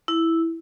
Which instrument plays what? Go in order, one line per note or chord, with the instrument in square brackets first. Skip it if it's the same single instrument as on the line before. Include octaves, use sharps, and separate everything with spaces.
[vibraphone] E4